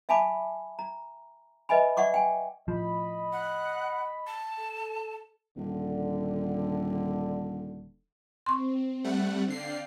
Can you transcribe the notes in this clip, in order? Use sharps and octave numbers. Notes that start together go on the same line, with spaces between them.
E5 F5 G#5 A5 B5 D6
A#5
B4 D#5 E5 G#5 B5
D5 E5 F#5 C#6 D6
G5 G#5
A2 F3 D#5 B5
F#5
A5
A4
D#1 D3
C4 C6 C#6
G3 A3 F#5
D3 D5 F5 G5 C7